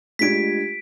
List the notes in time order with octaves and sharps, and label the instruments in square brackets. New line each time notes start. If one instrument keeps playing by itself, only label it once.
[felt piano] G#3 D4 G#6 [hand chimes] A3 F4 G4 [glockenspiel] B6 D7